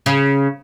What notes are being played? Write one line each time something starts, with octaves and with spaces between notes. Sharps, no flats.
C#3